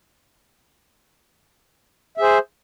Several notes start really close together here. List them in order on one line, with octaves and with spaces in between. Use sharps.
E5 G#4 C5